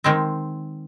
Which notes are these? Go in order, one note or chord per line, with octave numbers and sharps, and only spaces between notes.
D#3 G#3 C4